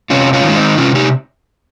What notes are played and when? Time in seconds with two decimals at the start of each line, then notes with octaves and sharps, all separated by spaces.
0.10 C3 C#4 F4
0.33 C#4 F4
0.44 D#3
0.49 G#3
0.56 C4 D#4
0.78 C3 C#4 F4
0.95 D#4 G4